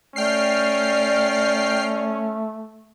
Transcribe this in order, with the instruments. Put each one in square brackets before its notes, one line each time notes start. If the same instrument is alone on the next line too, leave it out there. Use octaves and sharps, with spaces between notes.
[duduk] A3 [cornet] C#4 [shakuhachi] D5 [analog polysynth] G5 F6 C7